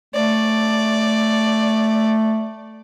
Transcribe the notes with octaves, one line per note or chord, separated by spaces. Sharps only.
A3 D5